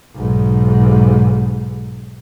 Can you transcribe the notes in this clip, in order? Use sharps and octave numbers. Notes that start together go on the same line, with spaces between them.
B1 G#2